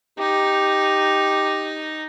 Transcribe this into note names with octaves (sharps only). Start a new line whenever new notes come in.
D#4 G4